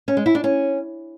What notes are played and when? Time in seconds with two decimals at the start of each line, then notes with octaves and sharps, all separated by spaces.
0.08 C#4
0.17 G#3
0.26 E4
0.35 D4
0.44 C#4